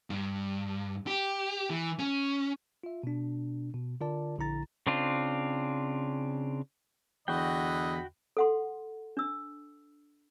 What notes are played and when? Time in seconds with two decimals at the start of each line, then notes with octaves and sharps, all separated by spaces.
0.10 G2
1.07 G4
1.70 E3
1.99 C#4
2.83 F4 E5
3.03 B2 D4
3.74 B2
4.01 D3 F4 A#4 D5 A5
4.38 A#1 D3 E4 A#5 A6
4.87 C#3 C4 D4 F4
7.28 E2 D3 F#4 D#5 G5 B5
8.37 A4 F#5 C6
9.17 D4 E6